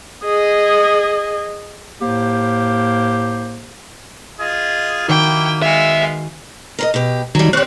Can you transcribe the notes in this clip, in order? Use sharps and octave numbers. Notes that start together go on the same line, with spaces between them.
G#4 D#5
A2 A#3 G4 C5
F4 G#4 D#5
D#3 A#3 D#4 E4 F#4 G5
G#3 B3 E5 F5
A#4 B4 D#5
B2 G4
D#3 F#3 G3
C4 G4 C#5 F#6